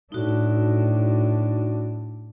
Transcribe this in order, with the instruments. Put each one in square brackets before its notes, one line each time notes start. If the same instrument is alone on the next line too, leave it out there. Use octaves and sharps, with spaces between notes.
[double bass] A2 D4 [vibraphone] D#4 F#4